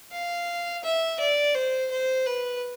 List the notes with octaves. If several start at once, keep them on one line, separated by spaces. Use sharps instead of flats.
F5
E5
D5
C5
C5
B4